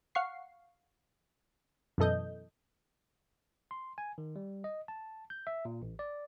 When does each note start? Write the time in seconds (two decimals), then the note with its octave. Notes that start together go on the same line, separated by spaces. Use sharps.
0.15 F5 F#5 C#6 C7
1.98 F#2 B2 E3 A4 D#5 G6
3.71 C6
3.98 G#5
4.18 D#3
4.36 G3
4.64 D#5
4.88 A5
5.30 G6
5.47 E5
5.65 A#2
5.82 A1
5.99 D5